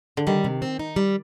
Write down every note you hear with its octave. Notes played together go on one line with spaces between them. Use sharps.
D3
D#3 G3
C3
C4
D#4
G3